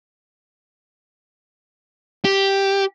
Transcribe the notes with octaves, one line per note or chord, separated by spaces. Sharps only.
G4